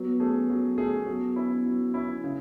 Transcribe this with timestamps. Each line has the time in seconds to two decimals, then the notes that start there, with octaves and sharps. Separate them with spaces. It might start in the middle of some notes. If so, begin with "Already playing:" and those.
Already playing: F#3 B3
0.20 A3 C#4 G#4
0.50 F#3
0.78 A3 C#4 G#4
1.07 F#3 B3
1.36 C#4 E4
1.66 F#3
1.94 C#4 E4
2.24 C#3